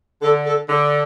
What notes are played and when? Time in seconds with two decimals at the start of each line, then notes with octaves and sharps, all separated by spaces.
0.22 D3 A4
0.45 A4
0.69 D3